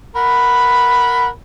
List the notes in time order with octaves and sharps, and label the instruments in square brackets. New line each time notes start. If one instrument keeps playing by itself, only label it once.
[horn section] A#4 F#5 B5